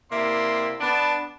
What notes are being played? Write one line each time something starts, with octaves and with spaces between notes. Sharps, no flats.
C3 A#3 E4 D5 E5 C6
B3 D4 A5